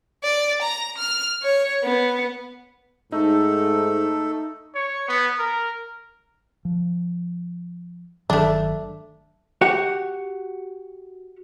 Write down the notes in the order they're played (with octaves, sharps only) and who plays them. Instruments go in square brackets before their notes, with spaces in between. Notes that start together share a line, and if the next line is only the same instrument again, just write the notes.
[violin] D5
A#5
F6
C#5
B3
[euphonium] G#2 [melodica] A3 A4 [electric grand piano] D#4
[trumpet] C#5
B3
A#4
[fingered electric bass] F3
[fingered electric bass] G1 D#3 F#3 [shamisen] A3 D4
[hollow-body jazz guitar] F#4 G4 F#5